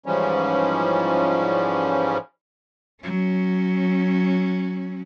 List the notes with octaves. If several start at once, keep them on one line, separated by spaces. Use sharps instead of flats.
G#2 E3 F3 G3 C#4
F#3 C#4